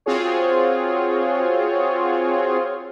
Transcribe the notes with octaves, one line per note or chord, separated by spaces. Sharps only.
C4 F4 F#4 G#4 C#5